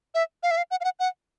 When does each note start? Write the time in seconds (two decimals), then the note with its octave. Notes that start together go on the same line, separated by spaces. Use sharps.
0.15 E5
0.43 F5
0.51 E5
0.57 F5
0.71 F#5
0.81 F5
0.84 F#5
0.99 F#5